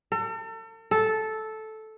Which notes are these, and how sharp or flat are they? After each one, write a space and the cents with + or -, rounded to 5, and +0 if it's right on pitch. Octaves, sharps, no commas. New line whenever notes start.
A4 +40
A4 -10